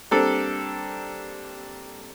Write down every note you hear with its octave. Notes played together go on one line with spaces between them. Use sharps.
G3 A#3 C4 D4 A4